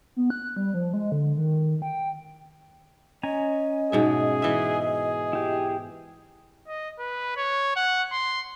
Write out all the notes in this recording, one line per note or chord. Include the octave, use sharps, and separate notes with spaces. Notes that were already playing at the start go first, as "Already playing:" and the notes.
B3
F#6
G3
F3
G#3
D3
D#3
G5
C#4 D#5 G#5 A#5
G#2 B2 G#4 E5
E3 E5
G#4
E4 G4
D#5
B4
C#5
F#5
C6